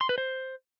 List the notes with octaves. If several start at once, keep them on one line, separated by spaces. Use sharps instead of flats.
C6
B4
C5